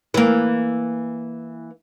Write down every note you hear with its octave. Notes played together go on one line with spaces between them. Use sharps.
E3 A#3